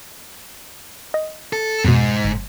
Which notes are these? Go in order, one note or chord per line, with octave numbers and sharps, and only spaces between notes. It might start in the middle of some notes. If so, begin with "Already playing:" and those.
D#5
A4
F2 G#2 B2
G1